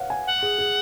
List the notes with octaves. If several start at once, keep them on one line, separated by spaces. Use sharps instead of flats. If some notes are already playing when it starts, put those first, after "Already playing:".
Already playing: B4 C#5 F5 F#5
G#5
F#5
G#4
G#4